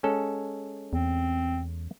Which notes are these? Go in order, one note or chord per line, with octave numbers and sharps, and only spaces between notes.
G#3 C#4 A4
E2 C4